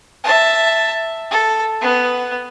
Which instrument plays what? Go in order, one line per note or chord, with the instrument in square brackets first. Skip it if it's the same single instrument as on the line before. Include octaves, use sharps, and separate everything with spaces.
[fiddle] E5 A5
A4
B3